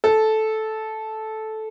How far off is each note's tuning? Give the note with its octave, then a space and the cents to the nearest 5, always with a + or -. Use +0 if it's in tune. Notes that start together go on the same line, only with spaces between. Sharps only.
A4 -10